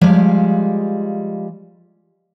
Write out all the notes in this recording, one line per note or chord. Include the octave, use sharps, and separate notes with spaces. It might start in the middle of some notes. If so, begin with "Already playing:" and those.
F3 G3 G#3 F5